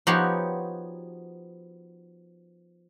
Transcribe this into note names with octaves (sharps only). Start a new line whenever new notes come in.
F3 B3 D#4 F#4 G4 C#5